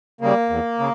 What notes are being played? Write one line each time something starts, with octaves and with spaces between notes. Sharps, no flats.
C#3 G3 A#3
E2
C#3